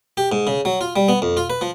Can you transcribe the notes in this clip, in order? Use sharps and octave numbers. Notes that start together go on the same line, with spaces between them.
G4
G#2
C#3
F#3
F4
G3
B3
F2
F4
B4
F3